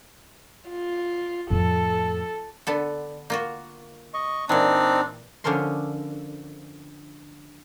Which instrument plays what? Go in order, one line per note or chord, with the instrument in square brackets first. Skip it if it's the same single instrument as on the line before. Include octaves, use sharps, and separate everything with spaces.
[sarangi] F4
[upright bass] F2 A2 [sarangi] A4
[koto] D3 B3 A4
A#3 F4 F#4
[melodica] D#5 C#6
[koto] A#2 E3 [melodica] C4 D#4 [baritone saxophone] D4
[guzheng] D3 F3 C#4 A#4 C6